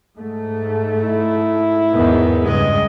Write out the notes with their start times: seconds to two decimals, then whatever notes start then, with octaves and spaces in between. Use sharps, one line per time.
0.17 G#2 A3
1.04 E4
1.92 E2 G#2 D#3 B3
2.45 C#2 G2 G#3 D#5